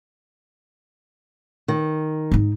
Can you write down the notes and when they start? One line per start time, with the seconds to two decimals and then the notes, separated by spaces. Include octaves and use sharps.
1.68 D#3
2.32 G#2 D#4